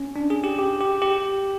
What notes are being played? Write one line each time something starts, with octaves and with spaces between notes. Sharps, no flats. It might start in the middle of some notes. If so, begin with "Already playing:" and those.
Already playing: C#4
D4
G#4
G4
G4
G4
G4